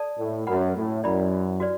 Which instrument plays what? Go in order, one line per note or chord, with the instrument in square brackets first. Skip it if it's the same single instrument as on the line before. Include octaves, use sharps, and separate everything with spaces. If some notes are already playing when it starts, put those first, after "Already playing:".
Already playing: [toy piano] A4 D5 A5
[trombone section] A2
[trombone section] F#2 [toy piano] B4 F#5 B5
[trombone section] A2
[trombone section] F#2 [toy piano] E4 D5 B5
[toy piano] F#4 B4 D5